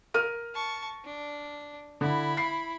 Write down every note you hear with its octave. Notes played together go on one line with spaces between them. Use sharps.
A#4 F6 D#7
A5 C#6
D4
D3 E4 B5
C7